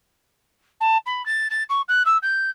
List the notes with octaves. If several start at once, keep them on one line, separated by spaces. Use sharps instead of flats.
A5
B5
A6
A6
C#6
F#6
E6
G6